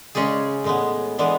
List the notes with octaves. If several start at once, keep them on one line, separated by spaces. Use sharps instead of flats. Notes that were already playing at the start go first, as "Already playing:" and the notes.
C#3 G#3 C#4 G#4 D5
A2 G#3 B3
E3 G#3 B3 D4